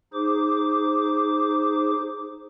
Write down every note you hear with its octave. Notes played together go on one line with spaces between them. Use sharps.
D#4 G#4 C5 D6